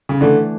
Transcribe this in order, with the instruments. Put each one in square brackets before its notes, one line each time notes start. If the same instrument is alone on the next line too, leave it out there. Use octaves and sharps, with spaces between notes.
[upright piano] C#3
[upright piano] D3 [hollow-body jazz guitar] E3 A3 D4